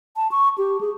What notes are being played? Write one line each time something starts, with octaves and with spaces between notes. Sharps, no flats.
A5
C#6
G4
G#4